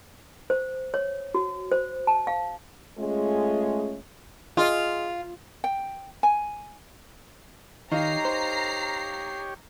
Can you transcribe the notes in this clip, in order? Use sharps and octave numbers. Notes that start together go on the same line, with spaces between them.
C5
C#5
F#4
C5
A5
F5
G#3 A3 C#4 F4 G#4
F4 G#4 D#5
G5
G#5
D#3 D#4 G4 C#5 F5 A#5 C7
C5